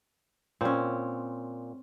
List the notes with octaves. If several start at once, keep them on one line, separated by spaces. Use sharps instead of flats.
A#2 C4 C#4